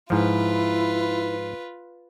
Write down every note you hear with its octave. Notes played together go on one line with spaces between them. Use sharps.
G#2 F3 E4 F4 B4